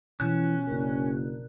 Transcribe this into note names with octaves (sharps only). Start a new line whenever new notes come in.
B2 E3 F3 C#4 F#6
F#1 D4 A#4